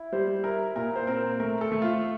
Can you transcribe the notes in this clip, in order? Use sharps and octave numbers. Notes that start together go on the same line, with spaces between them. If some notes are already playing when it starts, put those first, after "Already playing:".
Already playing: E4
G3 C5
E4 A#4
A#2 A#4
C5
C4 A#4
A3 A#4
A4
A3
F4